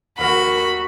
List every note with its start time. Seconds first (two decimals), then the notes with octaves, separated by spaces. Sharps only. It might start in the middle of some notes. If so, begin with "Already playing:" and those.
0.18 D#2 F#4 A#4 B5